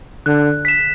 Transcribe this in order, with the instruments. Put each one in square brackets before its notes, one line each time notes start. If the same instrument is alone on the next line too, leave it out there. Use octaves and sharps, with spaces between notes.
[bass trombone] D3 [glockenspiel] F#6
[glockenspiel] B6 E7